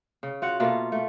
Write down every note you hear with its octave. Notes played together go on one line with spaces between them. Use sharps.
C#3
F4 F#4 F#5
B2 A3 A#3 F4
A3